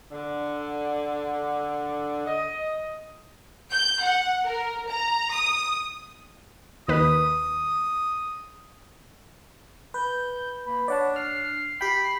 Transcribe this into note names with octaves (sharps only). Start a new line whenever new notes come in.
D3
D#5
G6
F#5
A#4
A#5
D#6
D#2 D#3 B4 D#6
B4 G6
A#3 B5
D4 C#5 D5 F#5 A5
F6 C7
G4 G5 B5